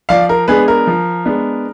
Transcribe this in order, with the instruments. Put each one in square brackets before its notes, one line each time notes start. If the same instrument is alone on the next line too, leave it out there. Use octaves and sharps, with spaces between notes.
[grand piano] F3 D5 F5
A#4
G#3 B3 D4 G#4 B4
A#4
F3
G#3 B3 D4